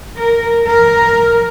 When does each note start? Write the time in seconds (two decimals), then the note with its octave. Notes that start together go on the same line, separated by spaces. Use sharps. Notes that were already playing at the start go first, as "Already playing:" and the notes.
0.15 A#4
0.68 A#4